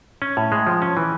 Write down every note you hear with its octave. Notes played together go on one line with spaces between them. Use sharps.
C#4
A2
G#3
F3
C#4
E3